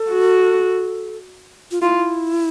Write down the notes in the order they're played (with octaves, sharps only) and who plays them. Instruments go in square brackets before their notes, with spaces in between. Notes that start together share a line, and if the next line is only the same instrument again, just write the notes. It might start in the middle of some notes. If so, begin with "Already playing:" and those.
Already playing: [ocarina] A4
[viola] F#4
[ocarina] F4
[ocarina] E4 [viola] F4